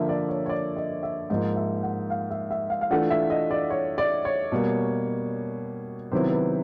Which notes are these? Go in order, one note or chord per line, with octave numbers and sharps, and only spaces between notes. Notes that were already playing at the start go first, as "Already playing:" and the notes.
Already playing: D3 F3 A#3 E5
D5
C#5
C#5
D5
D#5
E5
G#2 F3 A#3 D#5
E5
F#5
F5
E5
E5
F5
F5
E3 A3 D4 F4 F#5
E5
D#5
D5
C#5
D5
C#5
B2 G3 A#3
C3 D#3 F#3 B3 E4 C5
B4